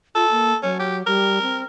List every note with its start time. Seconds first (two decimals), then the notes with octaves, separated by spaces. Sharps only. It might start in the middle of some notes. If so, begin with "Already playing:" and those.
0.15 F4 A4
0.31 A#3
0.63 F#3 C#4
0.79 G4
1.06 G3 A#4
1.42 C4